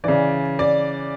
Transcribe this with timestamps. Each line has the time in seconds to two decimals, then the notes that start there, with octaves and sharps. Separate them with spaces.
0.04 C#3 E3 D5
0.59 D5